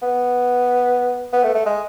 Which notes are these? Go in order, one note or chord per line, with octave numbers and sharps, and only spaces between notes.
B3
B3
A3
A3
G#3